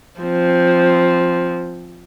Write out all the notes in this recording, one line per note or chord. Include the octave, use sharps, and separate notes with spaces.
F3 C4